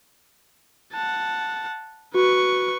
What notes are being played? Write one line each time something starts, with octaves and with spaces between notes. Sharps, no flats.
F#5 A5
F#4 B4 C#6